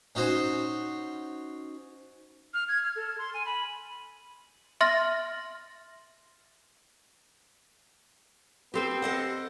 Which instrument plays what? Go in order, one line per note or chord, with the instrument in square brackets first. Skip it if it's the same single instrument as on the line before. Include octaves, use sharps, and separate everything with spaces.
[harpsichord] C#4 D#4 F#4 C5
[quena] F6
G#6
F6
A4
C6
G#5
B5
[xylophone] E5 C6 F6 A6 A#6
[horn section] B3 C4 [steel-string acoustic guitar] G4 A4 C5
[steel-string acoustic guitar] A4 D#5 F#5